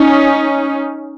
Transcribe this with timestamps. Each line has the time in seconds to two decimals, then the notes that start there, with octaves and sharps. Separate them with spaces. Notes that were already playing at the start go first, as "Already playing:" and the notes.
Already playing: C#4 D#4